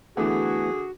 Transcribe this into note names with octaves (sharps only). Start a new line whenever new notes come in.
D3 E3 A3 B3 F#4 G#4